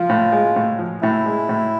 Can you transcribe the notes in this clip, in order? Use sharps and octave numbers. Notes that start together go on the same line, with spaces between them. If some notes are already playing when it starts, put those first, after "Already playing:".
Already playing: F3 F4
A2
G#3
A2
F3
A2 E4
G#3
A2